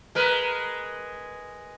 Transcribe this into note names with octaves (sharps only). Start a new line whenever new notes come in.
G#3 A#4 B4